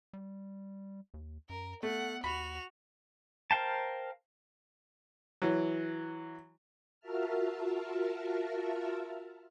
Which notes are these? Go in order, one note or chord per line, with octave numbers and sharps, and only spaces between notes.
G3
D#2
F#2 A#4
A3 B3 F#5
D#2 F#4 B5 F7
A#4 C5 F5 G5 A5
E3 F#3
F4 F#4 A#4 E5 A5 F6